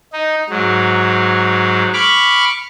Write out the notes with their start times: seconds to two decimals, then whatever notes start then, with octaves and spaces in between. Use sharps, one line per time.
0.13 D#4
0.49 G#2 F#3
1.94 B5 C#6 D6 F6